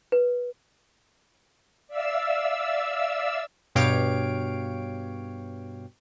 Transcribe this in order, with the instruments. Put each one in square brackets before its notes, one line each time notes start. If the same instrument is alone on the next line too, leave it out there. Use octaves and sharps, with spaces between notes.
[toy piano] B4
[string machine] D5 E5 F5 E6
[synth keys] G2 B2 G4 C#5 F5 D7